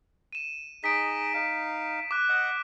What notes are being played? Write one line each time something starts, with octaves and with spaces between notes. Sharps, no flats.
D#7 E7
D#4 G#4 D#5 B6 D7
D#4 F5
D6 F#6
D#5 F#5